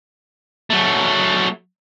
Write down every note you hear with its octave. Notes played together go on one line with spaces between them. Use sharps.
F#3 A3